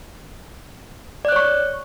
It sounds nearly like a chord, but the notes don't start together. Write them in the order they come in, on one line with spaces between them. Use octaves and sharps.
D5 F#6 C#5 C#6